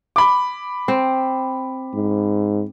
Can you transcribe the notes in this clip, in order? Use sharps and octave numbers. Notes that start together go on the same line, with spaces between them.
B5 D6
C4
G#2